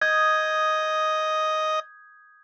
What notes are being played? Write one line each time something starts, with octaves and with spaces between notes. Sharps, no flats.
D#5 D#6 G6 G#6